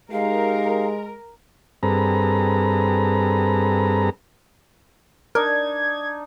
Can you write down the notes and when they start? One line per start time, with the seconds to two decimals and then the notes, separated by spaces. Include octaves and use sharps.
0.12 G#3 D#4 G4 A#4 F5
1.83 G2 C4 G#4 A4 B4 A#5
5.35 D4 D#4 A#4 G#6